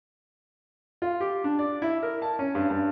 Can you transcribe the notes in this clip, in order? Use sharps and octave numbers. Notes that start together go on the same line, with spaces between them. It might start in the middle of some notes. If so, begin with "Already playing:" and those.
F4
G4
D4
D5
E4
A#4
A5
C#4
G2
G2